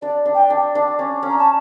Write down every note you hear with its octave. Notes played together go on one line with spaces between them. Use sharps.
D4 D5
D4
G5
D4
D4
C#4
C#4
A#5
A5